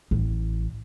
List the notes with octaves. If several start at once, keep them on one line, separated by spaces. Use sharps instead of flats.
A1